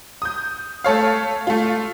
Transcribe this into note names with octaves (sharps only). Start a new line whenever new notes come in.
D#6 G6
A3 A4 C#5 F5
A3 F4